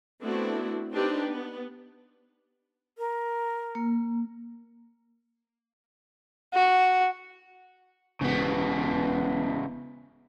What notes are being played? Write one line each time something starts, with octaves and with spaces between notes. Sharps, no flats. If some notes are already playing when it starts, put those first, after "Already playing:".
A3 B3 C4 D4 E4 F#4
C4 D4 D#4 G4 B4
B3
A#4
A#3
F#4
E1 C#3 B3